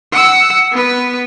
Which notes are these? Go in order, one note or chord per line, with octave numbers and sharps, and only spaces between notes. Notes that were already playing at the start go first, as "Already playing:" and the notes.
F#5 E6
B3 B4